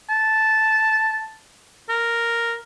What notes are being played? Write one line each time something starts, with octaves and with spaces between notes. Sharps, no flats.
A5
A#4